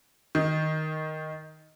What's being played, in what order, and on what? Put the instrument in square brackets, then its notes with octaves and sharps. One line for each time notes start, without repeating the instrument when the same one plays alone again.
[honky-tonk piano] D#3